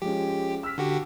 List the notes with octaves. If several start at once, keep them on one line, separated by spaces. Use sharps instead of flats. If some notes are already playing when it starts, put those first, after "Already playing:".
F3 G#3 C#4 G4
E6 F6 B6
D3 F#4 G4